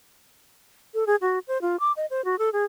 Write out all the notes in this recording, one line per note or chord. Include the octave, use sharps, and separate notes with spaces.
A4
G#4
F#4
C5
F4
D6
D#5
C5
F#4
A4
G#4